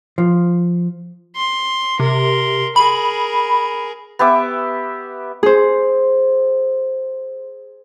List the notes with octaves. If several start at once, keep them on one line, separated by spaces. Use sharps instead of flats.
F3
C6
C3 A#4 C6
G#4 A#4 B5
B3 G4 E5 D6
G#4 C5